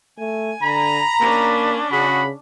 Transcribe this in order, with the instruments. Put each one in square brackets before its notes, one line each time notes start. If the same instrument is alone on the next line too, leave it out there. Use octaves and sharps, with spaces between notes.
[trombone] A3 [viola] G#5
[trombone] D3 [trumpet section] A#5 [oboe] B5
[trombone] A#3 [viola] C#4 D4
[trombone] C#3 [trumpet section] F#4 G#4 F#5 [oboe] B5